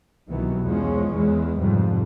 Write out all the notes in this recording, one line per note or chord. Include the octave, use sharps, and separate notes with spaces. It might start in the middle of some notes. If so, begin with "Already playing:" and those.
C2 B2 D#3 E3 F#3 B3
E2 F3 G#3 C#4
E2 E3 G#3
F2 G#2 C3 G3